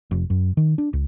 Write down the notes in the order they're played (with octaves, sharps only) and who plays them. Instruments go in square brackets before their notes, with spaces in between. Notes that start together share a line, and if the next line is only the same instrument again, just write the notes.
[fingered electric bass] F1
F#2
D#3
D4
C#2